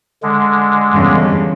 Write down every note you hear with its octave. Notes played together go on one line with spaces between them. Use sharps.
D3 G#3
E2 G2 C#3